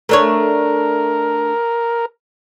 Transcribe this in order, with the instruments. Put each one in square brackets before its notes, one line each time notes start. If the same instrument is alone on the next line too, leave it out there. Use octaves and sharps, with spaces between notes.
[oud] A3 D4 C#5 [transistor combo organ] A#4